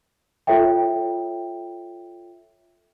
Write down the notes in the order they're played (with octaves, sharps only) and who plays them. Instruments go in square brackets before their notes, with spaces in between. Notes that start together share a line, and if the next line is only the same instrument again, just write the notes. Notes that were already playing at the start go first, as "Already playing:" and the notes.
[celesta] F4 A4 C#5 E5 G5